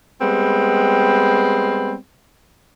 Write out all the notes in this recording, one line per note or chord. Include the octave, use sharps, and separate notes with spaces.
G3 G#3 B3 C4